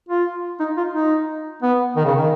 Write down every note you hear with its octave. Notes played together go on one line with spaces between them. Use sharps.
F4
D#4
F4
D#4
B3
D#3
C#3
D#3